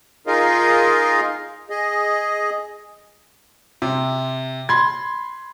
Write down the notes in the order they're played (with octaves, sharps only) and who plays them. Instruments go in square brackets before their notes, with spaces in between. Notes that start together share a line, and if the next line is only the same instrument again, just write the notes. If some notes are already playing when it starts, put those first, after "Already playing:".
[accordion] D#4 F4 G#4 A#4 D#5 F5
G#4 D#5
[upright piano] C3
B5 C6 G#6